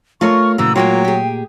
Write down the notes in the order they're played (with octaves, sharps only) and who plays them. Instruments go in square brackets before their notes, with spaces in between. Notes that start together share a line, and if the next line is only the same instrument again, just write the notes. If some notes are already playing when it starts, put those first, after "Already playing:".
[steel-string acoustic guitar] A3 [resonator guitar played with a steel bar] F4 A#4 C#5 [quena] C#6
[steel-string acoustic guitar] A#2 A#5 [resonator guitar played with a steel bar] C#3 E3 F#4 [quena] E6
[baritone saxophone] F#3 [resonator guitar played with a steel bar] G#3 A#3 F4 [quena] G5
[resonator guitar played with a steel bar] G4 G#4